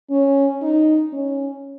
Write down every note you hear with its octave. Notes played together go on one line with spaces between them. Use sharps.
C#4
D#4
C#4